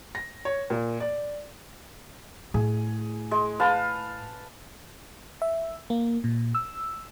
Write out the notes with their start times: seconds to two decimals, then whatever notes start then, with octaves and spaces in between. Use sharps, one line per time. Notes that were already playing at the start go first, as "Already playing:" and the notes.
0.15 A#6
0.45 C#5
0.70 A#2
1.00 D5
2.54 A2 G#4
3.31 G#3
3.60 B4 F5 A5
5.42 E5
5.90 A#3
6.24 A#2
6.55 E6